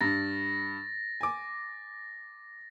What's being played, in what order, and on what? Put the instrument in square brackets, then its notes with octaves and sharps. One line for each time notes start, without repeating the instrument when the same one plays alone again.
[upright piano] G2 [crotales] A6 A#6
[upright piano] G#5 D6